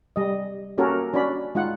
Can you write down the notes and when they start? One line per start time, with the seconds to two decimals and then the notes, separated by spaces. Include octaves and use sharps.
0.16 G3 D#5
0.78 A#3 C#4 F#4 G4 A4 A#4
1.14 C#4 D4 F#4 D5 B5
1.55 G#3 D#4 F4 F#5